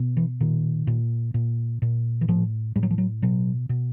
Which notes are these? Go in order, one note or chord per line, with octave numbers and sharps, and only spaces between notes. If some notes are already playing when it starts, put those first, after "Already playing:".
Already playing: B2
E3
A#2 D#3
A#2
A#2
A#2
E3
A2 F3
A2 G3
F#3
F3
F#3
B2 F#3
B2